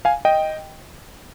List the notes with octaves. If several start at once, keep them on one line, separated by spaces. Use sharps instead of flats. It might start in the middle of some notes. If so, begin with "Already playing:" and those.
F5 G#5
D#5 G5